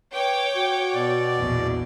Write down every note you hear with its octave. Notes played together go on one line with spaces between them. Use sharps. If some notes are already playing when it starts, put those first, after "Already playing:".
B4 C#5 G5 D6
F#4
B2 D5
A#1 E2